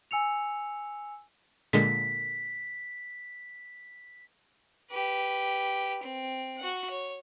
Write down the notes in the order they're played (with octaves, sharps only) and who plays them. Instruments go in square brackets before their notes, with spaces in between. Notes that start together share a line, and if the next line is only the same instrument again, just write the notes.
[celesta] G#5 E6 C#7 F7
[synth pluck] A#2 D3 G#3 [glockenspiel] B6
[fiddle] G4 B4
C4
F#4 F#5
C#5